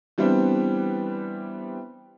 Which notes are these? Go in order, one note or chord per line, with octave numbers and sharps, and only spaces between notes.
E3 G3 B3 C4 D4